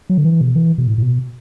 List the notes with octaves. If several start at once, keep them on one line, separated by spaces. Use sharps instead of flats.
F#3
D3
E3
B2
E3
B2
A2
A2
B2